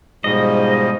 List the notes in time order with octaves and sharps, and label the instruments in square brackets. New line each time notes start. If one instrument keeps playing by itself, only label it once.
[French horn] G#2 [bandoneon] B2 F3 G3 [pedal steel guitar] D#5